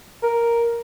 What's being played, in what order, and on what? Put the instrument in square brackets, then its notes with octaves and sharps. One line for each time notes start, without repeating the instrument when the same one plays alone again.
[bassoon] A#4